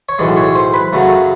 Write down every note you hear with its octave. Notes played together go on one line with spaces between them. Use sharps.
C#5
B1 A2 E3 G#3 D5
C#5
C5
B4
F#2 C#3 F#3 A3